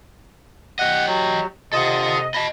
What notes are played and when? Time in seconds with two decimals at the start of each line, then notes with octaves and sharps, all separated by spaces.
0.79 G4 D#5 F#5
1.07 F#3
1.73 C3 F4 A4 D#5 F#5
2.34 D#5 A5 B5